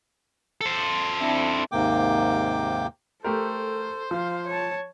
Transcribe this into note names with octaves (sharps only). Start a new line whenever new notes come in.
A4 C5
C4 D4 E4
D#2 G#2 C3 A#3 G5 D6
A3 G4 A4 A#4 C5
F3 F5
C#5 A5